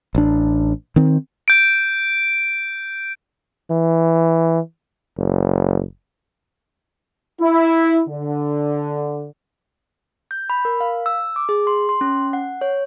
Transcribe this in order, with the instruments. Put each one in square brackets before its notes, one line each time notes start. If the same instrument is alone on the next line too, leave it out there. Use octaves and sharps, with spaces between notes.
[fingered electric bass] A1 D4
D#3 C4
[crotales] G6 D7
[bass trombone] E3
F#1
[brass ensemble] E4
D3
[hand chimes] G6
B5
A#4
F5
E6
D6
G#4
C6
C6
C#4
F#5
C#5